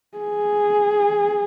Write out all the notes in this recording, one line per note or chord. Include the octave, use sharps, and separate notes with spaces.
G#4